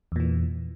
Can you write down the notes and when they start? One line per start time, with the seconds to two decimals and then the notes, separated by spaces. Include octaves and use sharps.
0.12 E2
0.16 A#2
0.20 E3